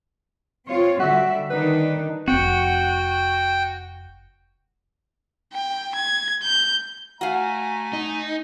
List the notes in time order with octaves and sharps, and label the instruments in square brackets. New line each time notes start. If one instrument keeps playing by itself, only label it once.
[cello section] C4 F4 C#5
[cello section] D3 G3 E5 [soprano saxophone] F#4
[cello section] D#3 D4 D#4 [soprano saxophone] B4
[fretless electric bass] F1 C4 [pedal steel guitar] F#4 [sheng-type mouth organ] G5
[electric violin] G5
G#6
G6
[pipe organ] A3 G#5 [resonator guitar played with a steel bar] F#4 F5 [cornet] A#5
[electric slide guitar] D#4